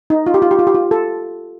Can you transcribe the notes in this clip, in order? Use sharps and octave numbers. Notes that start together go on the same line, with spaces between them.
D#4
F4
G4
F4
G4
F4
G4
F4
A4